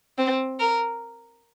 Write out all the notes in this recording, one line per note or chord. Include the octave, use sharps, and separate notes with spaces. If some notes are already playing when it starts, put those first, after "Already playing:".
C4
A#4